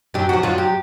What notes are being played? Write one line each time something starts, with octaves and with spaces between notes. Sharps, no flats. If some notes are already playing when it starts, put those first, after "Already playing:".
F#2 F#3 G4
F3 F#4
F#2 F#3 F4
G4